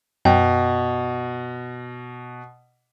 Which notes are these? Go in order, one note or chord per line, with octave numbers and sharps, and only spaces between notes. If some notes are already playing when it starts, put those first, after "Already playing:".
F#2 B2 G5